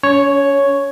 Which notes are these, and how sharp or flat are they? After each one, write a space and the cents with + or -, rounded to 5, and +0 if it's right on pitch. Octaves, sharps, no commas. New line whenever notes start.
C#4 +35 C#5 +0